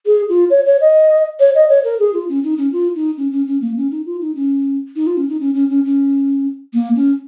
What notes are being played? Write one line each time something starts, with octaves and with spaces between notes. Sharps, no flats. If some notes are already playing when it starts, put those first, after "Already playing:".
G#4
F4
C#5
C#5
D#5
C#5
D#5
C#5
A#4
G#4
F4
C#4
D#4
C#4
F4
D#4
C#4
C#4
C#4
A#3
C#4
D#4
F4
D#4
C#4
D#4
F4
C#4
D#4
C#4
C#4
C#4
C#4
A#3
C#4